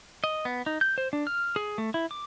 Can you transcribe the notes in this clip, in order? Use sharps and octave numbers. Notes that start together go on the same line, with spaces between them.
D#5
B3
D#4
G6
C5
D4
F6
G#4
A3
E4
D6